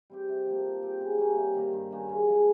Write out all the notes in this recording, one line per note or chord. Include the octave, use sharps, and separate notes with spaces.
G3 C4 G4
C3
F3 A#3
F3
C4 G4
C#3
G3 A#3 C#4
C3
D#3 G3 A#3
G2
D#3 A#3 C#4
C#3
F3 G#3